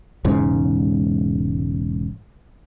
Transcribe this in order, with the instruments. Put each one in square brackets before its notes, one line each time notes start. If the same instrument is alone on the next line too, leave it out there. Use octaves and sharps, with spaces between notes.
[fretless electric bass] E1 G#2 C#3